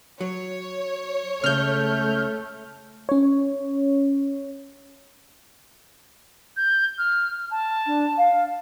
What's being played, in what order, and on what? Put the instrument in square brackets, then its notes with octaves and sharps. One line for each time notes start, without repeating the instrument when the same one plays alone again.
[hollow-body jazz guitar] F#3 [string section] C#5
[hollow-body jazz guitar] C#2 C#3 [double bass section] A3 [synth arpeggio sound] F6 G6
[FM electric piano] C#4 C#5
[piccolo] G6
F6
A5
[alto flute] D4
F5